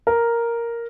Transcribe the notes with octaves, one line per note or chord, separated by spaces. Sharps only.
A#4